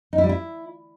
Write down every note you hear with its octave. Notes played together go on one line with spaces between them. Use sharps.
D#4
E4
G3
E4